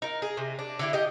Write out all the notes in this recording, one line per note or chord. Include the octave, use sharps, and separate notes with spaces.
D#4 A#4
G#4
C3
D4
D3 E4 G4
G4 D#5